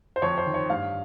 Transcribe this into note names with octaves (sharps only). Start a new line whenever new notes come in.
C5
F2 C#5
C5
D#3
C#5
G2 F5